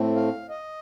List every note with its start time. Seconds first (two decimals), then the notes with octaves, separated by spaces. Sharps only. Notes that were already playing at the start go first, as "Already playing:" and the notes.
Already playing: A2 A3 C4
0.16 F5
0.50 D#5